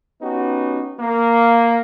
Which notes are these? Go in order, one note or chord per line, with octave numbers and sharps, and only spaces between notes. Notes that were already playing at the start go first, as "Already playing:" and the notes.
B3 C#4 D#4 F#4 G4
A#3